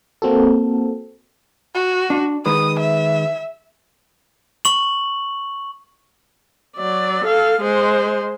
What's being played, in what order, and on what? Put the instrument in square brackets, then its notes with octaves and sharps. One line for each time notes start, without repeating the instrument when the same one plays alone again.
[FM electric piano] A#3 C4 F#4 A4
[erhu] F#4
[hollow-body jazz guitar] D4
[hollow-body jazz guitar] D#3 G#3 B4 [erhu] D#6
[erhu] E5
[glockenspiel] C#6 F#7
[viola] F#3 D5
A4 F5
G#3 C5